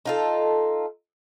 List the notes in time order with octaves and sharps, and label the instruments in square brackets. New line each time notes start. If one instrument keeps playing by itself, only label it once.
[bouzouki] D#4 F4 A4